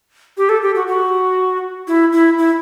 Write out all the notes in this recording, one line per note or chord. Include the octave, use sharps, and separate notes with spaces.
G4
A4
G4
F#4
F#4
E4
E4
E4